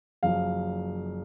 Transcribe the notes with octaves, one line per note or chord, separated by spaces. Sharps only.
F#1 F#2 F3 F5